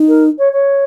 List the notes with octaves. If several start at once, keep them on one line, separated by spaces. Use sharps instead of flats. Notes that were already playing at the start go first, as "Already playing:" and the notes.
Already playing: D#4
A#4
C#5
C#5